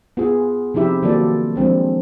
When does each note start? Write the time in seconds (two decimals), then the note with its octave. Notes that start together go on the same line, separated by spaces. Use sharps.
0.17 B3 F4 G#4
0.74 C3 F3 D#4 E4 G4 E5
1.03 D#3 F#3 A#3 F4 A4 D5
1.56 F3 G#3 C4 D4